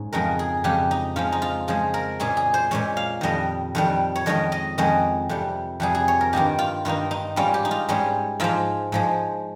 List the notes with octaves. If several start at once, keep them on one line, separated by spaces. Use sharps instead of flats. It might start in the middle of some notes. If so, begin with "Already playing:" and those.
Already playing: G#2 C#4
F2 C#3 G#3 A#4
G#4
F2 C#3 G#3 G4
D#4
C#3 F3 G#3 F4
D#4
F4
C#3 F3 G#3 G#4
A#4
A#2 G#3 C#4 G#4
G#4
C5
A#2 G#3 C#4 C#5
F5
F2 D#3 G3 D#5
F2 D#3 G3
C#5
F2 D#3 G#3 C#4 D#5
D#5
F2 D#3 G#3 C#4 D#5
F2 C3 G3
F2 C3 G3 G#4
G#4
C#5
A#4
G2 D#3 A#3 D#4 G4
F4
G2 D#3 A#3 D#4 F4
D#4
G#2 G3 C#4 F4
G4
D#4
F4
G#2 G3 C#4 G#4
G#2 F3 G#3 F4
G#2 F3 G#3